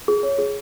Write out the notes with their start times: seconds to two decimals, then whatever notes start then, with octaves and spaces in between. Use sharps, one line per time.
0.08 G#4
0.23 C#5
0.38 G#4